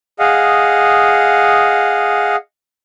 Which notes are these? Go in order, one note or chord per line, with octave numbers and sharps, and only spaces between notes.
G#4 D#5 F5 F#5